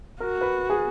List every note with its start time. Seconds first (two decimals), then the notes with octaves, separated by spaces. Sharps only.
0.20 F#4 A#4
0.41 B4
0.70 G#4